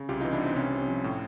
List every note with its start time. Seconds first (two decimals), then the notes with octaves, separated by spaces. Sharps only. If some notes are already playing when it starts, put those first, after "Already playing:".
Already playing: C#3
0.09 C2 F4 G4
0.21 D#4 F4
0.25 E3
0.32 D4 E4
0.40 C2 C4
0.56 C3 C#4
0.72 C3
0.88 F3
1.04 A2